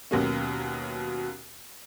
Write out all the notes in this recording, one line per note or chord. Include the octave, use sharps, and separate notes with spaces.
D#2 B2 F#3 A#3 C#4